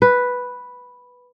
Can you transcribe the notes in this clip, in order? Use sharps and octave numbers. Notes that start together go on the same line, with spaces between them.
B4